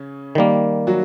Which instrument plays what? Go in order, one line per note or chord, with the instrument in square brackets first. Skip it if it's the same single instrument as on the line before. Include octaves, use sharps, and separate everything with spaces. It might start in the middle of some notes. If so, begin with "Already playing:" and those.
Already playing: [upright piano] C#3 C#4
[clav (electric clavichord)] D#3 G3 A#3
[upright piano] F#3 F#4